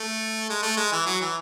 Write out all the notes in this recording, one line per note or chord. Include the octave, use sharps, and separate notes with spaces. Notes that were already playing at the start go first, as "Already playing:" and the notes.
Already playing: A3
G#3
A3
G#3
E3
F#3
E3